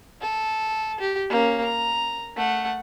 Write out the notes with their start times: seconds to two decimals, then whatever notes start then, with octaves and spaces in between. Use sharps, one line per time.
0.21 A4
1.00 G4
1.30 A#3 C#4
1.64 A#5
2.36 A3 F#5